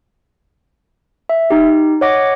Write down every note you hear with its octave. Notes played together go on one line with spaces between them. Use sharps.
E5
D#4 G4
C#5 D#5 F#5 D6 A#6